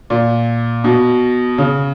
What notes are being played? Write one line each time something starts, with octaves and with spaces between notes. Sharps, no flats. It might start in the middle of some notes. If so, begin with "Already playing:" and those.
A#2
B2
C#3